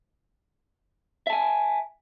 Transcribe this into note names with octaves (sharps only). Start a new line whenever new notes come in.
E5 G#5 A5